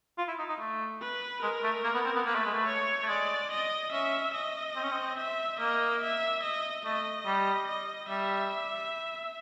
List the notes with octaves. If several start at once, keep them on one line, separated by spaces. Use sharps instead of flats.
F4
E4
D#4
D#4
A3
B4
G#3 A#4
A3
A#3
B3
C4
B3
A#3 B4
A3
G#3
A3
C#5
A3
G#3 D5
D#5
C#4 E5
D#5
C4
C#4
C4
E5
A#3 D#5
E5
D#5
A3 D#5
G3
D#5
G3 E5